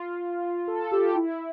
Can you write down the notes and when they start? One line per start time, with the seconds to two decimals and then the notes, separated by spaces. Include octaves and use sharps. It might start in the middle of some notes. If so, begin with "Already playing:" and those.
Already playing: F4
0.67 A4
0.92 G4
1.15 E4